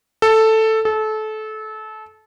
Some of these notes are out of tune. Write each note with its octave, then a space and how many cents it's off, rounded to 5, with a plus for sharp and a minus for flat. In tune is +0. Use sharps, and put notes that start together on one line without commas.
A4 +5
A4 -25